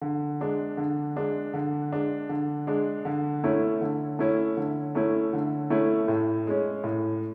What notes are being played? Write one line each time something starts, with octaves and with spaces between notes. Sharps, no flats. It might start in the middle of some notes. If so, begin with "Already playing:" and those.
D3
G#3 D4
D3
G#3 D4
D3
G#3 D4
D3
G#3 D4
D3
A3 C#4 E4
D3
A3 C#4 E4
D3
A3 C#4 E4
D3
A3 C#4 E4
A2
G#3 C#4
A2